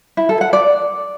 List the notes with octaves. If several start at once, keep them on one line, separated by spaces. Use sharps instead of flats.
E4
A4
F#5
D5